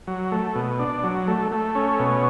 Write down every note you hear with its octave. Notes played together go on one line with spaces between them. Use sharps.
F#3
A3
B2
D4
F#3
A3
A3
C#4
B2